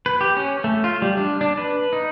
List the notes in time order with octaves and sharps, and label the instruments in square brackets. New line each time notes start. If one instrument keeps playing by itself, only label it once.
[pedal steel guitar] B4
G4
C#4
A3
F4
G3
D4
D4
B4
D#4